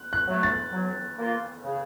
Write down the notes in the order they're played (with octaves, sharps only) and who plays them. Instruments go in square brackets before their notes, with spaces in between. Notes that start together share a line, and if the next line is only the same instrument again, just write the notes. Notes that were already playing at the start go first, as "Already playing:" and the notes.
Already playing: [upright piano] F#6
F#6
[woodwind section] F#3 A3
[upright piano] A6
[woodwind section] F#3
A#3 F4
C#3